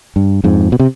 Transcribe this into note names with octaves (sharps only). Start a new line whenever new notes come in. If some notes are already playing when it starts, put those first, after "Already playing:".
G2
F2 G#2
B2
C3